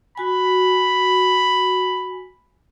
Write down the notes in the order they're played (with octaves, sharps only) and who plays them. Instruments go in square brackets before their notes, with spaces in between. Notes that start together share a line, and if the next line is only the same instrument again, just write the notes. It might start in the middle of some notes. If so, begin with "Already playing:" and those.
[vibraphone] F#4 G#5 [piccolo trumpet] B5